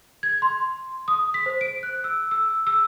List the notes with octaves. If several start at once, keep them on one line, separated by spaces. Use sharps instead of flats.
G#6
C6
D#6
B6
C5
D7
F#6
E6
E6
E6